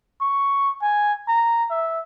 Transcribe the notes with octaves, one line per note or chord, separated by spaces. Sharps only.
C#6
G#5
A#5
E5